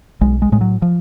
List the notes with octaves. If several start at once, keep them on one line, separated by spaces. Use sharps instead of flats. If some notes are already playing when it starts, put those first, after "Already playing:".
B1 G#3
G#3
A2 G#3
F#3
F3